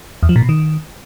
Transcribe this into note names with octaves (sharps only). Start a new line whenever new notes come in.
E2
F3
A#2
B2
D#3